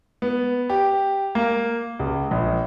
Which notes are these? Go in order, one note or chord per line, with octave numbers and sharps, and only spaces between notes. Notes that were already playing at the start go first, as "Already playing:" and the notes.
B3
G4
A#3
C#2
A#1